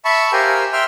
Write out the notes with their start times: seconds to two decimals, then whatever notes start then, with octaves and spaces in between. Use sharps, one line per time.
0.05 E5 A5 B5 C#6
0.33 G4 A#4 C5 F5 G5 G#5
0.72 E5 G5 C6 F6